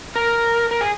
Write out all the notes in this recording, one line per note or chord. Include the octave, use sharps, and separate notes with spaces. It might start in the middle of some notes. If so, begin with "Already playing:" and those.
A#4
A#4
G#4